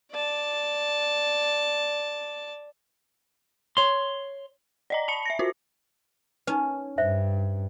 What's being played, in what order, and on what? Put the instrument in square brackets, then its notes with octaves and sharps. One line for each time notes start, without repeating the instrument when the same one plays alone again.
[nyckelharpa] D5 A5
[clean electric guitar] C#5 C6
[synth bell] D5 D#5 A#5
A5 B5 C#7
E5 A#6
F4 F#4 C5
[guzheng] C#4 [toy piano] D#4 B4
[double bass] G2 [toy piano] C5 E5